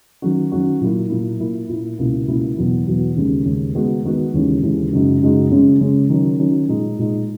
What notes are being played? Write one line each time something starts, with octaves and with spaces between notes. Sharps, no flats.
D#3 F#3 C#4 F#4
D#3 F#3 C#4 F#4
A#2 F#3 A#3 E4
A#2 F#3 A#3 E4
A#2 A#3 E4
A#2 A#3 E4
C#2 B2 A#3 E4
C#2 B2 A#3 E4
E2 B2 F#3 B3
E2 B2 F#3 B3
D#2 C#3 G#3 C#4
D#2 C#3 G#3 C#4
D#3 G#3 B3 D#4 F#4
D#3 G#3 B3 D#4 F#4
D#2 C#3 E3 G#3 C#4
D#2 C#3 E3 G#3 C#4
F#2 C#3 G#3 D#4 F#4
F#2 C#3 G#3 D#4 F#4
C#3 G#3 C#4
C#3 G#3 C#4
D#3 F#3 C#4
D#3 F#3 C#4
A#2 G#3 D#4
A#2 G#3 D#4